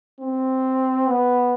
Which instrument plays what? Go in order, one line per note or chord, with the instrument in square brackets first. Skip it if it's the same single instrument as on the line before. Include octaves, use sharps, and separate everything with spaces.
[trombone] C4
B3